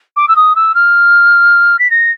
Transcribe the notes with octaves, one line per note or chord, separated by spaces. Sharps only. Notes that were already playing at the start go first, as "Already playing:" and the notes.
D6
E6
D#6
E6
F6
B6
A#6